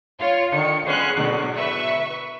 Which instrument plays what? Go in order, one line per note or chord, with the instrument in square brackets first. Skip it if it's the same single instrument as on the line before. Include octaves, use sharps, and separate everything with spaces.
[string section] F4 C#5
[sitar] D3 D#3 [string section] C#7
[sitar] G#3 B3 C#4 [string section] C6 F#6
[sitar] G#2 D3 F#3 [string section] B2
[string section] B4 E5 C#6